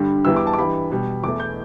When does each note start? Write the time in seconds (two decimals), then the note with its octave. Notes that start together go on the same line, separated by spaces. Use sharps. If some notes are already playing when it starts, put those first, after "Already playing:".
Already playing: G2 D3 G3
0.25 E2 E3 G3 E6
0.36 D6
0.47 A5
0.53 D6
0.58 G2 E3 G3 B5
0.91 B2 G3
1.24 E2 E3 A3 D6
1.40 G6